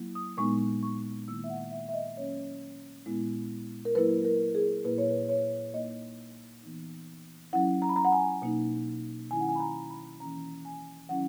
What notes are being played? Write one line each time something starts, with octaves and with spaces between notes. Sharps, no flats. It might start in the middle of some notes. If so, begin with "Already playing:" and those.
Already playing: F#3 A#3 E4
D#6
A#2 G#3 B3 D#4 C#6
C#6
D#3 A#3 E4 E6
E5
F#5
E5
E5
D#5
F#3 A#3 C#4 C#5
A#2 G#3 B3 E4
A#4
F#3 A#3 E4 B4
A#4
G#4
A#2 A#3 E4 B4
C#5
B4
C#5
A#2 A#3 D#4 D#5
E3 B3 D#4
F#3 C#4 E4 F#5
A#5
B5
A#5
F#5
G#5
B2 A#3 D#4
D#3 F#3 C#4 E4 G#5
F#5
G#5
B5
A#5
B5
E3 A#3 C#4 A#5
G#5
D#3 F#3 C#4 E4 F#5